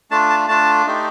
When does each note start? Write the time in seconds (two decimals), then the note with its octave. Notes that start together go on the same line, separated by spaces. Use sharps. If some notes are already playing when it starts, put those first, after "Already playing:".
0.11 A3 D4 F4 A5
0.30 A5
0.48 A3 D4 F4 A5
0.86 A3 D#4 G4